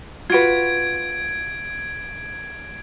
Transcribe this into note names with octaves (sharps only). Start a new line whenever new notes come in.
F4 F#4 B4 G#6 D7